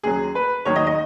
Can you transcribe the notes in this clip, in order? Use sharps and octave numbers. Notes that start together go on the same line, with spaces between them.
D#2 C#3 F#3 G#4
B4
D#2 D#3 F#3 C#5
D#5
D#5